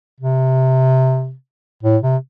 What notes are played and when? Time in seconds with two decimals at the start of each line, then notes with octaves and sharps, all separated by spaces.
0.20 C3
1.83 A2
2.02 C3